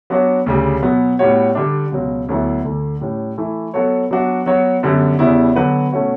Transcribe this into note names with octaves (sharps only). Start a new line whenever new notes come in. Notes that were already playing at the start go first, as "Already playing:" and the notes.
F#3 B3 D4 F#4 C#5
D2 C#3 G3
B2 F#3 B3
A2 G3 B3 F#4 C#5
D3 G3 D4
C#2 B2 F#3
D2 D3 F#3 B3 E4
D2 D3 A3
A2 G3 C#4
E3 A3 E4
F#3 B3 F#4 A4 C#5
F#3 B3 D4 F#4
F#3 B3 F#4 C#5
F#2 D3 G3 B3
E2 C#3 G3 B3 E4
D3 F#3 B3 F#4 B4
B2 A3 C#4 F#4